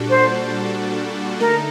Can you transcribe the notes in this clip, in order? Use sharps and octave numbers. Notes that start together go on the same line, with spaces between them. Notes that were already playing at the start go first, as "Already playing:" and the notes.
Already playing: A#2 G3 D4 F#4 A4
C5
D3 A3 D#4 A4 A#4